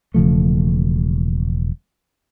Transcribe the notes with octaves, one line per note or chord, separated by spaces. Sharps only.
E1 C#3 F3 A3